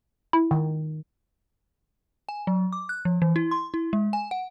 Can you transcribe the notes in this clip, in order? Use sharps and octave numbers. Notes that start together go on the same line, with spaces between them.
E4
D#3
G#5
F#3
D6
F#6
F3
E3
E4
C6
E4
G#3
G#5
F#5